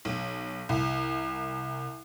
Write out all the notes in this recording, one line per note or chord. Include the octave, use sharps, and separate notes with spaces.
B1
C2